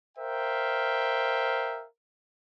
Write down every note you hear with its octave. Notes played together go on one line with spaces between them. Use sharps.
A#4 C5 E5 F5 G5